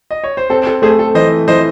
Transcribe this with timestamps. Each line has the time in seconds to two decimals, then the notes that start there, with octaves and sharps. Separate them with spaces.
0.11 D#5
0.24 C#5
0.37 C5
0.50 C4 A4
0.67 A4
0.82 A3 G#4 C5
0.99 A4
1.15 E3 C5 D#5
1.48 E3 C5 D#5